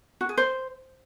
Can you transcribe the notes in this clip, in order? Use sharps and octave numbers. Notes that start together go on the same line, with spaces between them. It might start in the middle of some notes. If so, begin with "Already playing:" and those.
F#4
G#4
C5